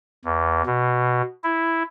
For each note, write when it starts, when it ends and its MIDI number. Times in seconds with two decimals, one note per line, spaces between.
0.25 0.62 40
0.66 1.22 47
1.44 1.83 64